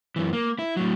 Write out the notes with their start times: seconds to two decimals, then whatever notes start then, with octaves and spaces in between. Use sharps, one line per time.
0.16 F#2 E3
0.33 A#3
0.59 E4
0.77 A2 F#3